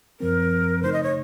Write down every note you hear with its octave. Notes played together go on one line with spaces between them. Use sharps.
F#2 F3 C4 A#4
C#3 A3 D#4 C5
D#5
C#5